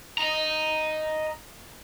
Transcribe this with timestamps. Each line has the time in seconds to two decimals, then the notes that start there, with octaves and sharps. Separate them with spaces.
0.18 D#5 A#5